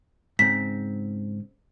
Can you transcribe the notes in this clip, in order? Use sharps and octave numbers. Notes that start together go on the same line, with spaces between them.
G#2 C#3 C4 B6